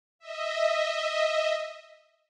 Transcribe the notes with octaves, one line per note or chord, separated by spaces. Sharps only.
D#5 E5